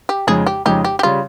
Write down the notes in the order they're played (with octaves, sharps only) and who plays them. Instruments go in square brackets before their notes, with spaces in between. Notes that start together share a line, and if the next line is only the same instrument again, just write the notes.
[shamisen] G4
[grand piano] F2 C#3 G#3 D#4 [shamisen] G#4
[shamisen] G4
[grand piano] F2 C#3 G#3 D#4 [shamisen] G4
[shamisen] G4
G4
[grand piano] C#3 G3 [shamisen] F4